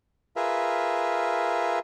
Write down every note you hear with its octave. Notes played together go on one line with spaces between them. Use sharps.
F4 G#4 A#4 B4 E5